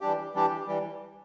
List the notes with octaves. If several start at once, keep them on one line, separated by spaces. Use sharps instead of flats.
E3 G3 D4 G4
E3 G3 D4 G4
E3 G3